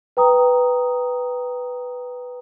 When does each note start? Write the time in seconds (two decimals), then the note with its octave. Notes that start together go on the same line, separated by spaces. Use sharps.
0.17 B4 G5 A#5 D#6